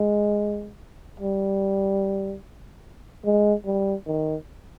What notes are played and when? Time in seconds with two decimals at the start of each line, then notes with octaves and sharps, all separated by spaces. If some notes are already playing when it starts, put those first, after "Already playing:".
Already playing: G#3
1.20 G3
3.25 G#3
3.66 G3
4.07 D#3